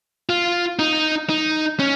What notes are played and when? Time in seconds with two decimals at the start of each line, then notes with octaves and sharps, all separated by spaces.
0.29 F4
0.79 D#4
1.29 D#4
1.79 C#4